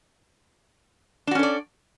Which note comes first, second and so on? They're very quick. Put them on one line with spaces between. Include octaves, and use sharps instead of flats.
D4 F#4 C#4 A4 D5